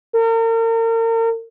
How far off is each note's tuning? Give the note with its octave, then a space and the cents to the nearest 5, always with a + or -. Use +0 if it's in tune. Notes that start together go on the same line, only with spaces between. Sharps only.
A#4 -40